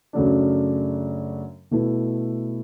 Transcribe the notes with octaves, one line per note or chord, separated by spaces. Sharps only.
F#2 C#3 F#3 A3 D4
B2 A3 E4 B4